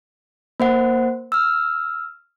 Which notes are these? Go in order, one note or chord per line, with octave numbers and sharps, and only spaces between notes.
A#3 C5 F#5
E6 F6